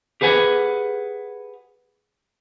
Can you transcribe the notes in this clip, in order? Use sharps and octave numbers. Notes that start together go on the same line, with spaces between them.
G4 G#4 B4 F#5 G#5